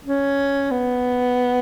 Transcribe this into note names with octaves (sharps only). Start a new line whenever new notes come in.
C#4
B3